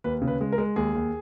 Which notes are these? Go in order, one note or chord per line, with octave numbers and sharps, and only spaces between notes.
D#2 B4
C#3
B4
G#3
A#4
G#3
D#2 G#4
D#2